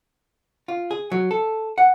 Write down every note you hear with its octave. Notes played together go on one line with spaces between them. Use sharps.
F4
G#4
F#3
A4
F#5